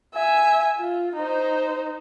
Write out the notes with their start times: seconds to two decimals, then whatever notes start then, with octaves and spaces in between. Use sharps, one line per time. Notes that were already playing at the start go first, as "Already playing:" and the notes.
0.14 E5 G#5
0.78 F4
1.16 D#4 C5